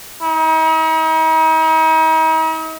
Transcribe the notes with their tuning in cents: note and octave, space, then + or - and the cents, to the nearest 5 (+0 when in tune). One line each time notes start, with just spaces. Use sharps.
D#4 +40